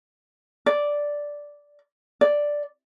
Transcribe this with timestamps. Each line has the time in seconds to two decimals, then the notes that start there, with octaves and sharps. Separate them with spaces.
0.66 D5
2.21 D5